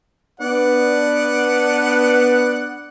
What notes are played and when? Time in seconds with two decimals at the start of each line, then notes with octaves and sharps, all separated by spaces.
0.40 B3 D4 D5 F#5